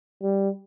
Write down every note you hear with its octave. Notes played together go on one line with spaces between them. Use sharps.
G3